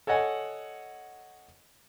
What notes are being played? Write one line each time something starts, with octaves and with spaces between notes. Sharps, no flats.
A4 C#5 D#5 F#5 G#5